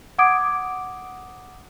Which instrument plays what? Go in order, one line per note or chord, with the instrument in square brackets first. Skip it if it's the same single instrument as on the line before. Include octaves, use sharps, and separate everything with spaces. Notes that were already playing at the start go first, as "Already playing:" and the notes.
[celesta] F#5 D6 D#6 G#6 D7